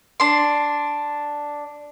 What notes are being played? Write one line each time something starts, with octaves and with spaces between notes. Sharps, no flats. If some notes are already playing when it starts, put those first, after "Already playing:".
D4 C6